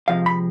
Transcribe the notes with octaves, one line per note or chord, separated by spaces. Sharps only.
C3 F3 G#3 F5
B5